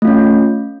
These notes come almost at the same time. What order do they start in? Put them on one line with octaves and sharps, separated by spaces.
A3 F4 C#4